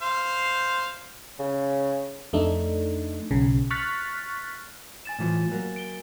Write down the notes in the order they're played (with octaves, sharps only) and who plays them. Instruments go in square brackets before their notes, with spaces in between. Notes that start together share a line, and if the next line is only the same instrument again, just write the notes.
[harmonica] C5 F5
[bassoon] C#3
[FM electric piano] F2 A3 D4 D#4
B1 C#3
C#6 F6 F#6 A6 B6
[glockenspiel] G#5 A6 E7
[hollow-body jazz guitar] A2 E3 F3
F#3 A#3
[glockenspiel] D7 G7